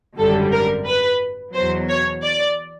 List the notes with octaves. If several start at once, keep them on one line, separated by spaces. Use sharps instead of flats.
G#1 F#2 D3 G3 A4
A#4
B4
E2 B2 F#3 C5
C#5
D5